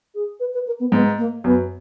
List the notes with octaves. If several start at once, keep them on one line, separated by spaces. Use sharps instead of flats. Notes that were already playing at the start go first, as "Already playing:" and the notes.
G#4
B4
B4
A#4
B3
G#2 B3
A#3
F#2 B3